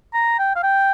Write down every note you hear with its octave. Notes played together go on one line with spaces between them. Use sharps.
A#5
G5
F5
G5